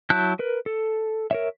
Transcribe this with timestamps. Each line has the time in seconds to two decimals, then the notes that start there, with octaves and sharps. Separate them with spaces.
0.10 F#3 E4 A5 F#6 G6
0.39 A#4 B4
0.66 A4
1.31 A#4 C#5 E5